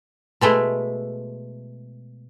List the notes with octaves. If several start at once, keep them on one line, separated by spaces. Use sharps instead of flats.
B2 G#3 A3 E4